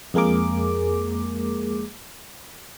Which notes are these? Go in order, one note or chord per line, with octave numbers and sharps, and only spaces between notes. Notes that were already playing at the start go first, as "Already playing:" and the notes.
F2 G#3 A#3 G#4 A#4 D6